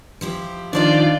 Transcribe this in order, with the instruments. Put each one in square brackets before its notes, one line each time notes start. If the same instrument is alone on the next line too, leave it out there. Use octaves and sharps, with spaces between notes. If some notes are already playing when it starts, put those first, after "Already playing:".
[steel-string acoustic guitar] F3 E4 G4
[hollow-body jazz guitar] D#3 F3 D#4 [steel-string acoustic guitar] D4 C5 F5 [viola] F4 D5